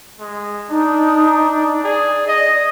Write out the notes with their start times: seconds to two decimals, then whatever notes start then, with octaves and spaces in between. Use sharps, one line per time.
0.20 G#3
0.70 D4 D#4
1.84 G#4 D5
2.27 D#5